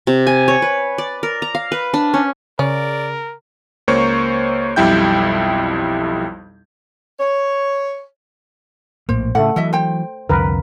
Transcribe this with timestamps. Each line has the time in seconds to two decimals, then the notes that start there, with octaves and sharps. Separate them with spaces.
0.07 C3
0.27 G#5
0.48 C#5
0.62 B4
0.98 D5
1.23 A#4
1.42 A#5
1.55 F5
1.72 B4
1.94 D4
2.14 C#4
2.59 C#3 C#4 A#4 D5
3.88 C#2 A#3 C5 C#5 C#6
4.76 B1 F2 G3 E4 G5 G6
7.20 C#5
9.09 A#1 A2 A#3 C5
9.35 A2 C#3 A3 F#5
9.56 E3 F#3 A4 D#5 E5
9.73 C5 G5
10.29 C2 F2 D3 A#4 B4